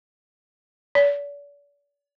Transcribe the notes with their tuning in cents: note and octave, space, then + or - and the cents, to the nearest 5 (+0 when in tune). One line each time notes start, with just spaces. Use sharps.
D5 -40